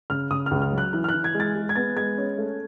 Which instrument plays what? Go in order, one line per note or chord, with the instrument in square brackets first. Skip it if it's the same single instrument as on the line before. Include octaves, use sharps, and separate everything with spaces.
[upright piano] C#3 F6
C#3 D#6
F6
C#2
F6
F#3
F#6
E3 F#6
F6
F#6
E3
G#6
G#3
A6
G#3
G#6
B3 A6
G#3 G#6
C#4
A3